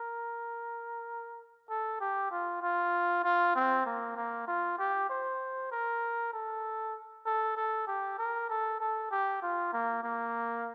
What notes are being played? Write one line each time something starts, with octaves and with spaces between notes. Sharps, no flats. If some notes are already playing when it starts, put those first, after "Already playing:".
Already playing: A#4
A4
G4
F4
F4
F4
C4
A#3
A#3
F4
G4
C5
A#4
A4
A4
A4
G4
A#4
A4
A4
G4
F4
A#3
A#3